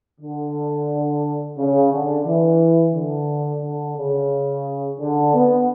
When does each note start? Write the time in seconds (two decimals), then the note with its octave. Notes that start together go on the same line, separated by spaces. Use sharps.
0.21 D3
1.58 C#3
1.93 D3
2.26 E3
2.94 D3
3.62 D3
3.97 C#3
5.00 D3
5.34 B3